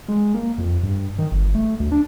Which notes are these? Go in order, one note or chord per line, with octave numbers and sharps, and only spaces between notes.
G#3
A#3
F2
G2
D#3
G1
A3
D2
D4